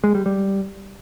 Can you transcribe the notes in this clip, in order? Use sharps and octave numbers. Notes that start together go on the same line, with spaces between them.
G#3
G3
G3